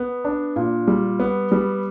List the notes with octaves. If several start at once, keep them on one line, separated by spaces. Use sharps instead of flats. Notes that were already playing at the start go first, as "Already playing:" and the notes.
Already playing: B3
D4
A#2
G3
B3
G3